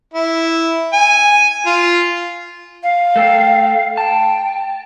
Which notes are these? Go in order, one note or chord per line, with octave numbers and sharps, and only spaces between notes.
E4
G#5
F4
F5
A3 A4 G5
G5 A5